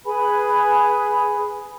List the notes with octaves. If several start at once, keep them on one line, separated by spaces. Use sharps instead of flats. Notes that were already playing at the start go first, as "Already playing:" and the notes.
G#4 B4 G#5 B5